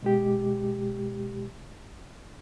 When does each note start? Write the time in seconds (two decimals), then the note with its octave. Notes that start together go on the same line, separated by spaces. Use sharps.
0.03 B2 G#3 G4